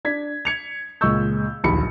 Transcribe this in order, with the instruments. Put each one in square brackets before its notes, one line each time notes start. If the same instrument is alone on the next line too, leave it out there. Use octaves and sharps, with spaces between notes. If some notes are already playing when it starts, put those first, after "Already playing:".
[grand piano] D4 G#6 B6
G#6 C#7 F7
C#2 A#2 G#3 C#6 E6 G6
D1 A#1 D#2 B5 C#7